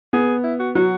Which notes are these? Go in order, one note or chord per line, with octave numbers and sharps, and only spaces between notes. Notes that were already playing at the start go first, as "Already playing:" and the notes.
B3 G#4
E4
F#4
F#3 F#4